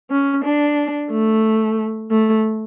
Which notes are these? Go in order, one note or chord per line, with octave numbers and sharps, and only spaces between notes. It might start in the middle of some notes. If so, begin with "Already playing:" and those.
C#4
D4
A3
A3